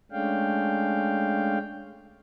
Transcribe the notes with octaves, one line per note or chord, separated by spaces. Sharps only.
G#3 A3 C#4 D4 F5 G5